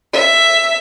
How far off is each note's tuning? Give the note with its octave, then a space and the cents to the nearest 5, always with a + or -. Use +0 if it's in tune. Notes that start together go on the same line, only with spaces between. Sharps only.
E5 +10